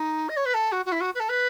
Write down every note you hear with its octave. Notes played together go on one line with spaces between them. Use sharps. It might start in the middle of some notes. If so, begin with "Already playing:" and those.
Already playing: D#4
D#5
C#5
B4
A4
F#4
F#4
E4
F#4
B4
A4
B4